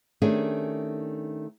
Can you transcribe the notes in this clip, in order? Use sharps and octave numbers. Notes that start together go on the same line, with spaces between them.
D#3 A3 C#4 D4 G4 G#4